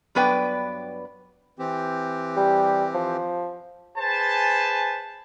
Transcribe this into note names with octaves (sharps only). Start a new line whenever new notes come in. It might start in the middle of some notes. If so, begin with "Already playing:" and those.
G2 F#3 B3 B4 D5 G5
E3 C4 G4
G3
F3
G#4 B4 C5 G#5 A5